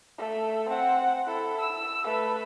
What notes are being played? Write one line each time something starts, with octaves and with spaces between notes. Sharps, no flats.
A3
C4 F#5
E4 A4
E6
A3 B4